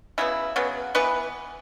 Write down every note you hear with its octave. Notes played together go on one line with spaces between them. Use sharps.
C#3 F#3 B3 E4
C#3 F#3 B3
E3 B3 B4